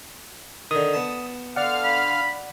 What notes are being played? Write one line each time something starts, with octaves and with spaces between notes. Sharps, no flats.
D3 D#3 D#6
B3 A5
D3 D5 F5 F#5 F6
B5